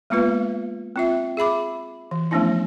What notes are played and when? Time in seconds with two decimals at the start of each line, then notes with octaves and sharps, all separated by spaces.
0.10 G#3 A#3 B3 F4 B4
0.96 C4 F4 E5
1.37 G#4 E5 B5 D6
2.11 E3
2.31 F3 A3 B3 C#4 D4 E4